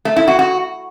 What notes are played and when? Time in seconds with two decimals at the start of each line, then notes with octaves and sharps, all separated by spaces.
0.05 A3
0.16 E4
0.28 F#4
0.39 F#4